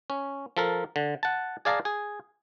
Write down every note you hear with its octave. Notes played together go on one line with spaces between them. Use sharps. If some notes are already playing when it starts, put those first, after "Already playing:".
C#4
F3 A4 A#4
D3
F#5 A5
G#4 D5 F5 A5 A#5
G#4